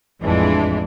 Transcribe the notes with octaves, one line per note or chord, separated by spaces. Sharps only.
A1 F2 E3 G#3 D4